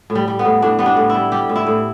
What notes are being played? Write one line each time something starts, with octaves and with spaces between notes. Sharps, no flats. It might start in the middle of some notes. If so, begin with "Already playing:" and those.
A2
G3
G3
B3
A2
A2 D4
G3 B3
D4
A2
E4
G3
G3 G4
A2
E4
A2